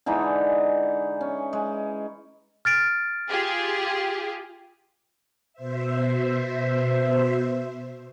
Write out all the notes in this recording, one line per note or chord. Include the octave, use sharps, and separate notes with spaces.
D3 E3 G#3 D#4
C#4
G#3
F6 A6 D7
F4 G4 G#4
B2 C5 E5